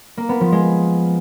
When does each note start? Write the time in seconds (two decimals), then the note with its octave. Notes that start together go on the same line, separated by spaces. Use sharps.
0.17 A#3
0.29 B3
0.41 F3
0.52 G#3